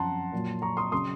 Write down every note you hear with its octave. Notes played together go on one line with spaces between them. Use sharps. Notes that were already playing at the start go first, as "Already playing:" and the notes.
Already playing: F#2 F3 F#5 A5 A#5 C6
A#2 F#3
A#5 C#6
C6 D#6
C#3 F#3 C6 D#6